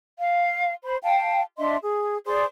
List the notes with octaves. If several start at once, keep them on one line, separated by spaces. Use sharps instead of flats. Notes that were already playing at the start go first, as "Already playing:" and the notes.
F5
C5 B5
F5 G5 A5
D4 D#5 E5 C6
G#4
G#4 C5 D5 C6